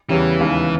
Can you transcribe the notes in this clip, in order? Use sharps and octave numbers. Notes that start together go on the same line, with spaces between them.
E2 C#3 E3 G3 C#4 G4
D#2 C#3 G#3 B3 D#4